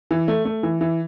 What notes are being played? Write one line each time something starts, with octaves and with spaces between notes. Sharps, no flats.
E3
A3
A3
E3
E3